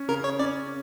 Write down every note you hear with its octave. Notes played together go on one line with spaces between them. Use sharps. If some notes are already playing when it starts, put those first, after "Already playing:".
Already playing: C#4
C#3 A#4
C#5
C#4 D5